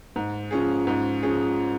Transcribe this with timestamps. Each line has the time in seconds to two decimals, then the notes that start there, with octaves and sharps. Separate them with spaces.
0.16 G#2
0.51 F3 C#4 G#4
0.87 G#2
1.23 F3 C#4 G#4